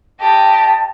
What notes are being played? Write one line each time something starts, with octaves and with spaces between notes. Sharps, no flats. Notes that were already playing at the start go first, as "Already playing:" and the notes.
G4 D#5 A5